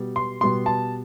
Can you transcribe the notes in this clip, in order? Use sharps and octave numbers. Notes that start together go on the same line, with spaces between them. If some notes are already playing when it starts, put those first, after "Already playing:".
Already playing: B2 G3 B3
C6
B2 G3 B3 C6
A5